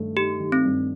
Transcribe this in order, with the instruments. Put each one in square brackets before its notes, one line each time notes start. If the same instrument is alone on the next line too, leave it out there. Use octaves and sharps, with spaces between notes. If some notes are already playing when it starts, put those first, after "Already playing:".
Already playing: [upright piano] G2 D#3 A3
[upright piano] D#4 [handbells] G4
[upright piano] D#3
[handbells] C4
[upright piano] G2